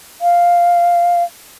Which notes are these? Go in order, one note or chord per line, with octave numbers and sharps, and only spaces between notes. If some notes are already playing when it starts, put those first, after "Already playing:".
F5